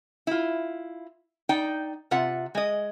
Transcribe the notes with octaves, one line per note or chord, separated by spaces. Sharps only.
E4 F4
D#4 D5 G5
C3 F4 E5 F#5
G#3 D#5